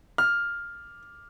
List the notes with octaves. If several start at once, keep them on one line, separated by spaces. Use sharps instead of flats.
F6